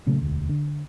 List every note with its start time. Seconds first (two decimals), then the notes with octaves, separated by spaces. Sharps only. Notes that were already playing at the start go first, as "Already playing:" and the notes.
0.06 A#2 C#3 F#3 A3
0.22 E1 D2
0.49 D3